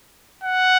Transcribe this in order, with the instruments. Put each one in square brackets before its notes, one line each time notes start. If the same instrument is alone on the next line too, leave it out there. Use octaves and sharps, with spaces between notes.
[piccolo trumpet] F#5